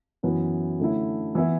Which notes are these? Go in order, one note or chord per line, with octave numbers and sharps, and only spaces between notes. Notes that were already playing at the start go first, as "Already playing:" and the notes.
F#2 E3 B3
D3 A3 C#4 E4
E3 B3 E4